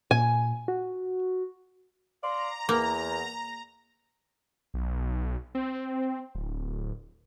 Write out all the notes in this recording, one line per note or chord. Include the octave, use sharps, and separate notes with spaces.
A#2 G#5
F#4
D5 F5 A#5 C6
E2 A#3
B1
C4
D1